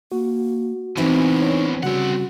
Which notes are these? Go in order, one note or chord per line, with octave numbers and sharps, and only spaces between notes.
A#3 F#4
E2 A2 E3 C4 D#4
D4 C#5 C#6
C#3 G3 C4 C#4 F#4 F#5